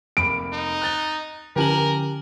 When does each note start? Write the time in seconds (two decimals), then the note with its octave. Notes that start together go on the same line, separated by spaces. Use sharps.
0.17 F1 A#3 B5 D7
0.53 D#4
0.82 F#6 A6 G7
1.56 D3 C#4 G4 A#4 G#5 F#7